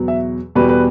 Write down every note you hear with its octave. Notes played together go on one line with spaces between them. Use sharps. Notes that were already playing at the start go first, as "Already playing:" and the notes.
Already playing: E2 B2 F#3
E5
E2 B2 G3 B4
B4